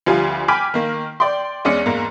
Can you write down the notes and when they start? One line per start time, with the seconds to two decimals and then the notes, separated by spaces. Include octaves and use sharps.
0.06 D2 F3 G3 F4 G#5
0.48 G5 G#5 B5 D6 F6 B6
0.74 D#3 A#3
1.20 D5 G5 C6
1.65 E2 G#3 C#4 D5 C#7
1.86 E2 G#2 A#3